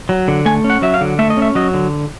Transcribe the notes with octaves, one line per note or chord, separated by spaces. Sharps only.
F#3
D3
A3 G#5
C#4
F#5
F#3 E5
F5
D3
A3 E5
D#5
C#4
E5
F#3 D#5
D3